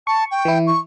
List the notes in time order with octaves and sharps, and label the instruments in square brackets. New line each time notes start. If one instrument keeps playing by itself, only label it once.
[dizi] A5 [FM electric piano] C#6
[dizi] G5
[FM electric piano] E3 E4
[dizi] C#6